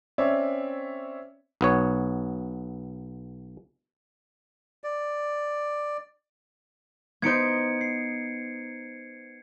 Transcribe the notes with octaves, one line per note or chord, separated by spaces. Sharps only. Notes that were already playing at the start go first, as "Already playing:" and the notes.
C4 C#4 C#5 D5 E5
B1 B3 C#5
D5
B3 D#4 C5 G#6 C#7 D7
C7